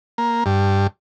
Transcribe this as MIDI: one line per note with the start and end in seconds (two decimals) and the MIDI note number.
0.18 0.44 58
0.46 0.87 43